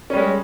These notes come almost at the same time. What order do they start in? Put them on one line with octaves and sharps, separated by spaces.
C#4 G3 G#3